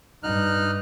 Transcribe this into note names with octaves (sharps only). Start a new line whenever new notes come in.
G2 D#4 F6 F#6